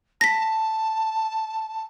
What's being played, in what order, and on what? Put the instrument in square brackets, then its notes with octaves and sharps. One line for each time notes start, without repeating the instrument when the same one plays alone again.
[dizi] A5 [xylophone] A#6 B6